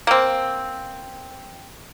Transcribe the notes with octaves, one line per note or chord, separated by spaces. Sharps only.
A#3 C4